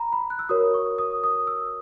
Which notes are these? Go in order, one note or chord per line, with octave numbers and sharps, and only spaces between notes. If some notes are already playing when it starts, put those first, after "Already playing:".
Already playing: A#5 B5
B5
F#6
E6
F#4 A#4 C#5 D#6
C#6
D#6
D#6
E6